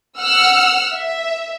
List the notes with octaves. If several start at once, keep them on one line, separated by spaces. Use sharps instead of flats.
F#5 E6 F6
E5